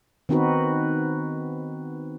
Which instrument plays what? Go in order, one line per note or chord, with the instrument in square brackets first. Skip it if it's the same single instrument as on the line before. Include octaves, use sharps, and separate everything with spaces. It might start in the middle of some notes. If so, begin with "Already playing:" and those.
[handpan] D#3 B3 C4 D#4 F#4 B4